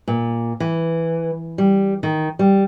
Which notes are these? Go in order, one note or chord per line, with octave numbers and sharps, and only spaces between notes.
A#2
E3
G3
D#3
G3